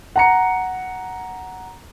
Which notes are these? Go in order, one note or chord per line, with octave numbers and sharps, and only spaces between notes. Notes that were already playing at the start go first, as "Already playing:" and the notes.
F#5 A#5 C#7